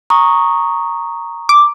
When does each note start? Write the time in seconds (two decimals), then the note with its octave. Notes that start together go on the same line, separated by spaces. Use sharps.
0.10 A#5 C#6 D#6
1.49 D6